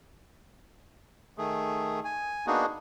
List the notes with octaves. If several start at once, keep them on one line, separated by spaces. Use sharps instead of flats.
D#3 A3 G#4
G#5
A#3 B3 D4 D#4 F#4 G#4